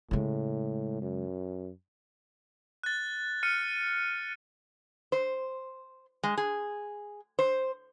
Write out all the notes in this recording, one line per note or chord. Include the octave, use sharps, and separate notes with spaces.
A2 C#3 G#3
F#2
F#6 A6
F6 F#6 C#7 D#7
C5
G#3
G#4
C5